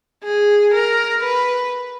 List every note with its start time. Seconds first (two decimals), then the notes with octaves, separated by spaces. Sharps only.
0.24 G#4
0.74 A#4
1.23 B4